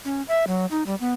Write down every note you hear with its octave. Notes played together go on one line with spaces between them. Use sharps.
C#4
E5
F#3
D#4
G3
B3